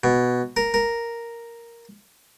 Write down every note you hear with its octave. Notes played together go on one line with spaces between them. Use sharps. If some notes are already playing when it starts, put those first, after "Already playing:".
B2
A#4
A#4